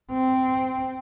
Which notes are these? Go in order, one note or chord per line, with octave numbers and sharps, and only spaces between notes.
C4